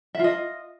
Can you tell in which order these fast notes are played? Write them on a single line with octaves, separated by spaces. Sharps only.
E5 F4 D#5